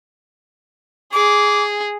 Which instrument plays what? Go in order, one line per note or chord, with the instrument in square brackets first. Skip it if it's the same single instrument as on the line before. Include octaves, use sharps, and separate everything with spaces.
[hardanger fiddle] G#4 [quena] D6